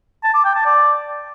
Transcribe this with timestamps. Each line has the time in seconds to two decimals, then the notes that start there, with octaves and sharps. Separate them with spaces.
0.24 A5
0.34 D6
0.45 G5
0.55 A5
0.66 D5